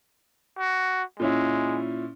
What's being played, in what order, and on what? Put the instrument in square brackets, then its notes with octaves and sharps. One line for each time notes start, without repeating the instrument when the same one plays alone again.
[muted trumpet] F#4
[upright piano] A#2 C#4 E4 [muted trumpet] G#3